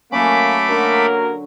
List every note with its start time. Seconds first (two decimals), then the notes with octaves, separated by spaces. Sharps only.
0.12 F#3 A3 A#3 C#4 B5 D6
0.69 D3 F#3 A#3 A#4